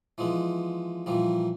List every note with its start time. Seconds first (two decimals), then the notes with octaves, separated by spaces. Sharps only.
0.18 E3 F3 G#3 B3
1.06 A#2 E3 F3 G3